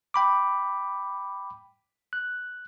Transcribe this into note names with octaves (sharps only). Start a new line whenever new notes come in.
G5 B5 D6
F#6